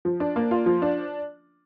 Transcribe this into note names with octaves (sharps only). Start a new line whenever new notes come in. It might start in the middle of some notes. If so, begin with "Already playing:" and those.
F3
D4
A#3
F4
F3
D4